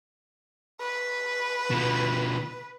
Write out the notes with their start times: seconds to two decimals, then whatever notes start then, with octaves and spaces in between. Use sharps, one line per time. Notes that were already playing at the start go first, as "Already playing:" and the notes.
0.81 B4
1.71 B2 F3